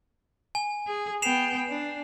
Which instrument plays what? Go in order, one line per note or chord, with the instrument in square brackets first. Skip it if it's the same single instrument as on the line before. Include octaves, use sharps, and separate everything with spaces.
[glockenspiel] G#5
[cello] G#4
[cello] B3 G5 [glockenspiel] C7 E7 F7
[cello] D4